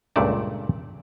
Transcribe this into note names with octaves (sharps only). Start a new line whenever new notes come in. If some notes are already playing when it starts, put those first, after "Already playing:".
C#2 G2 A#2 A3 D5 A5